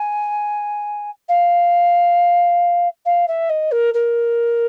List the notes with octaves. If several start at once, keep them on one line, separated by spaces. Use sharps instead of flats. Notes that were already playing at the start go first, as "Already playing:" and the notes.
Already playing: G#5
F5
F5
E5
D#5
A#4
A#4